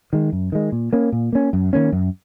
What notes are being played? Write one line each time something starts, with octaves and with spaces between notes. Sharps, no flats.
D#3 G#3
F#2
D#3 G#3
A#2
A#3 C#4
A#2
A#3 C#4
F#2
D#3 A#3 C#4
F#2